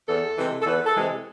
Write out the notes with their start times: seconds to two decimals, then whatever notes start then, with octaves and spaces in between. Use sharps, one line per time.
0.08 E2 A4
0.38 C3 E3 G#3
0.62 A4
0.66 E2 B4
0.86 A4
0.97 C3 E3 G#3